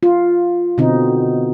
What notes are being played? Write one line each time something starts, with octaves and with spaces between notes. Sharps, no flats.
F4
B2 D3 C4 D#4 F4